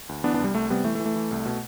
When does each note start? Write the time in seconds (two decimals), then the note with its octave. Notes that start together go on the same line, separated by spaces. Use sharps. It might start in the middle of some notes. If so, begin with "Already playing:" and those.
0.09 D2
0.24 E3 B3 D4
0.34 B3 D4
0.39 C2
0.44 G3
0.55 C2 A3
0.70 C3 G3 B3
0.84 E3 A3
0.95 A3
1.00 E3
1.06 A3
1.16 E3
1.31 C2
1.45 B2